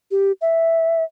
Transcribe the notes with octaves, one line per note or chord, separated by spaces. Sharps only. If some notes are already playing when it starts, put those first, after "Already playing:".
G4
E5